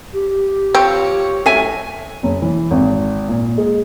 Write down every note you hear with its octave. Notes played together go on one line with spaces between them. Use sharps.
G4
F3 C4 C#5
F#2 A2 E5 G#5
F#1
E3
G#1
A#2
G#3